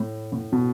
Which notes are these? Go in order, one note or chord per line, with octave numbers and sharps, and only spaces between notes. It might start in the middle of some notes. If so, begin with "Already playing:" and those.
Already playing: A2
A2
B2